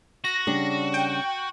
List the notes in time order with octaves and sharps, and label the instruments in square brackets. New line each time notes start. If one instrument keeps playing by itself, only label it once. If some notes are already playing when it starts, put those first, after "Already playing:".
[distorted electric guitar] F#4 [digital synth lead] A#6
[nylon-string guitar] C#3 G3 D4
[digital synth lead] G5